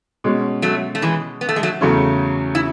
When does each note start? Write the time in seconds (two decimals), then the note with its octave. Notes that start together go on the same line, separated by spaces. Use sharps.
0.24 B2 G#3 C#4
0.62 F#3 A3
0.95 A3
1.02 E3 G#3
1.41 B3
1.49 A3
1.56 G#3
1.63 F#3 A3
1.81 E2 C#3 F#3 A3 C#4
2.55 E4